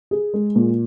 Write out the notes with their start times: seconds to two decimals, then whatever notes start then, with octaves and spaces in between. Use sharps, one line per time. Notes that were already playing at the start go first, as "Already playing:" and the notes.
0.11 G#4
0.34 G#3
0.56 A#2